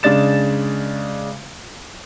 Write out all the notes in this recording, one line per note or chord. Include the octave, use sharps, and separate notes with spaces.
C#3 G#3 D4 A6 E7